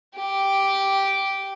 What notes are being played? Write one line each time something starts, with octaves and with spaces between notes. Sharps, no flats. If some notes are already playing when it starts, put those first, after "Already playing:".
G4